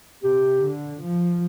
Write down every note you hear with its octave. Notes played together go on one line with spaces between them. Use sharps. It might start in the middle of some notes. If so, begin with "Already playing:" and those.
C3 G4
D3
F3